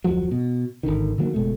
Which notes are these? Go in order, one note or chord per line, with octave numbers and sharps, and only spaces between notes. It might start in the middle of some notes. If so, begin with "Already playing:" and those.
D1 F2 F3 F#3
B2
G#1 D2 D3 D#3
D3 D#3 F#3 A#3
F#1 B2 G#3 A3